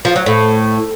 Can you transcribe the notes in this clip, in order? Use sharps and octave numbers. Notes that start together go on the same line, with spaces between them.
F3
F#3
A2